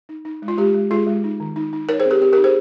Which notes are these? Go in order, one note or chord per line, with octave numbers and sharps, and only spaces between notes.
D#4
D#4
G#3
F4
G#3 G4
G#3
G#3 F4 G#4
G#3
D#4
D#3
D#4
D#4
D#4 A#4 C#5
G#4 C5
C4
G4 A#4
C4 G4
G4 A#4
D#4
G#4 C5